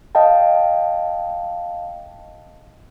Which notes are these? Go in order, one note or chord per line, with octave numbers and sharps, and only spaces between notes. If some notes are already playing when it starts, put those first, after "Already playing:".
D#5 F5 G5 A5